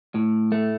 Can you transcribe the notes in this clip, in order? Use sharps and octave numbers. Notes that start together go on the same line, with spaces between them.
A2
A3